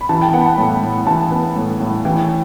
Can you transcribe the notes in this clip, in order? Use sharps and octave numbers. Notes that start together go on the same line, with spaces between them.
B5
E3 A5
G5
B3 F#5
B5
A5
A2
A2
E3 A5
B3
A2
A2
E3 G5